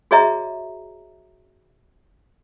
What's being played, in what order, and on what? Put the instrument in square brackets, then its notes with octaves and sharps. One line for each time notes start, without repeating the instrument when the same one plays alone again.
[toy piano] F#4 G#4 C#5 D#5 E5 A#5